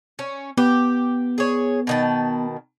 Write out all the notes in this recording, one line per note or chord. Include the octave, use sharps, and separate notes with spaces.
C#4
B3 G4
G#4 C#5
B2 D#3 A5